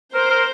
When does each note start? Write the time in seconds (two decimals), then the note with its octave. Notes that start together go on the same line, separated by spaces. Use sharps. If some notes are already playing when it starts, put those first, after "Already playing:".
0.14 A#4 C5
0.30 A#4